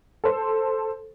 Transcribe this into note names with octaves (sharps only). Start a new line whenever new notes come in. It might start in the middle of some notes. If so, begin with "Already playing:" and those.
A4 C5